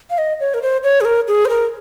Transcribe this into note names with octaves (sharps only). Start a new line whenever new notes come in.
F5
D#5
C#5
A#4
C5
C#5
G#4
A#4
G#4
C5
A#4